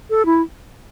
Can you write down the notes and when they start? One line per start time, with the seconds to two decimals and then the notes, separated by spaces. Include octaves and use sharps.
0.10 A4
0.26 E4